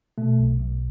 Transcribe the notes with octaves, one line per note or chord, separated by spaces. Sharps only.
B2 A3
B1
B1